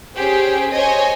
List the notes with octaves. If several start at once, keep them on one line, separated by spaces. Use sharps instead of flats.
C#4 G4 G#4 C5
C5 C#5 D#5 G#5